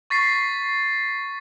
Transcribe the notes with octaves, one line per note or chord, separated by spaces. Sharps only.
C#6 A6 B6 C7